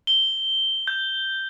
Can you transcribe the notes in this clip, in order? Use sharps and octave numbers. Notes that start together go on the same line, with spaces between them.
G7
G6